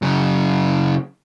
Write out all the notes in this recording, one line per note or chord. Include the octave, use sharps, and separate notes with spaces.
F#2 C#3